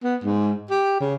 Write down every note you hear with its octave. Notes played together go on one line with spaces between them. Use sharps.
B3
G#2
G4
C#3